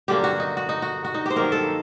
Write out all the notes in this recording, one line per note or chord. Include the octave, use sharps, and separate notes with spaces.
G2 D3 F#3 A#3 G4
F#4
D#4
F#4
D#4
F#4
F#4
D#4
G4 C5
G2 D#3 F#3 A#3 A#4
A4